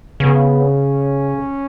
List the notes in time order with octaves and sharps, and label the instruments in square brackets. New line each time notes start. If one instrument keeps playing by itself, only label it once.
[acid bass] C#3 [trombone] B3
[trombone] C#4